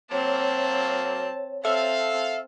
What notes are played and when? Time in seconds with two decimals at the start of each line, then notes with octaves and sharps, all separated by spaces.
0.12 F#3 A#3 C4 C#5 A5
1.64 C4 A4 E5 F5 A5